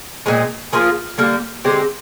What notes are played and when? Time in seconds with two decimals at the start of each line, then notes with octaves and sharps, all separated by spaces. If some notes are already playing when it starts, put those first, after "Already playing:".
0.26 A#2 G#3 C4
0.73 F3 A#3 F4 G#4
1.18 D3 G3 A#3
1.64 D3 G#3 C4 G4